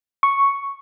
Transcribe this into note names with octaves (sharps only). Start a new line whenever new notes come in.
C#6